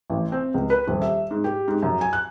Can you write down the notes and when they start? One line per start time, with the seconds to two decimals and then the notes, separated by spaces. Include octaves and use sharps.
0.10 A1
0.32 C4
0.54 C#2
0.70 B4
0.88 D#1
1.02 E5
1.31 G#2
1.44 G4
1.68 G#2
1.83 F#2
2.01 G#5
2.13 F#6